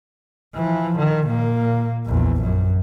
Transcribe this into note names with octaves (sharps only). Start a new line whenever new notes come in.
E3 F3
D#3
A#2 A#3
A#1 E2
F#2